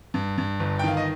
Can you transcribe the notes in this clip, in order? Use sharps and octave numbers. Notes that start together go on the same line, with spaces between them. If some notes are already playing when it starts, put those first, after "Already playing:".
G2
G2
G1
G5
D#3 F5
D#5